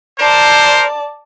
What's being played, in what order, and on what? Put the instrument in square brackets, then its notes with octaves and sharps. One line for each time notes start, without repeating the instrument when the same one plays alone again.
[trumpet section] A#4 C5 [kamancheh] D5 A5